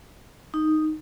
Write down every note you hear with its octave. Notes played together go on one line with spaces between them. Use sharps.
D#4